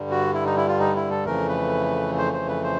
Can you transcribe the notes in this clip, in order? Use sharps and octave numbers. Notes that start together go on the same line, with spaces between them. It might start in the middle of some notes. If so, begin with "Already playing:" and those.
Already playing: G2 D3 G3
F#4
E4
D#4
E4
F4
D#4
E4
A4
F2 C#3 E3 A3 A#4
B4
C5
C5
B4
C5